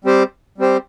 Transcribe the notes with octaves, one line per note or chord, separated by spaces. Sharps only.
G3 C4 G4 C5
G3 C4 G4 C5